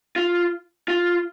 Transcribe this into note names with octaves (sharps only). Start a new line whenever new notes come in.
F4
F4